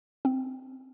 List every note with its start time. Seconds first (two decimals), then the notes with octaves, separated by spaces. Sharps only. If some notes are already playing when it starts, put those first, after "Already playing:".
0.25 C4